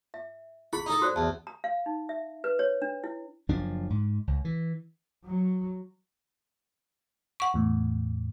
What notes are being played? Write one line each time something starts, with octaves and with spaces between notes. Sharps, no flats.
E5
E4 G#4 B5
D#4 A4
F#4 C5 D5
E2 A5
A#5
F5
D#4
E5
B4
C#5
D4
E4
F#1 F3 D4
G#2
C#2
E3
F#3
F#5 C#6
E2 A2